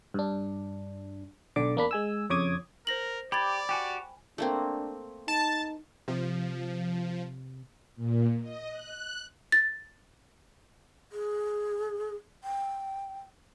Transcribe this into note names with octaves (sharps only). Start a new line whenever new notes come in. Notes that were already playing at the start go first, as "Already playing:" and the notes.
G2 D4
B1 D3 D5 D6
E2 A#3 D4 B5
G#3 G#5 E6
F2 C#3 C#5 D6 D#6 G#6
A#4 C5 A#6 F#7
G4 D5 B5 G#6 A6
F#4 G4 G5 G#5
A3 A#3 C4 D4
D#4 A5
C3 F3
A#2
D#5
F#6
A6
G#4
G5